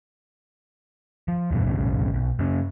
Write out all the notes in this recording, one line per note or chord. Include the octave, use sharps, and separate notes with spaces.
F3
E2 G2 B2
B1 F2 A2 C#3
B1
F#2 C#3